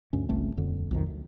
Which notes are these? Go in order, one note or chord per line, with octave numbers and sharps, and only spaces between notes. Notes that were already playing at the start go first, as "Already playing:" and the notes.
D2 G2 C#4
G1 C#2 A3 C4
D#1 F2 D3
B1 F2 D#3
D2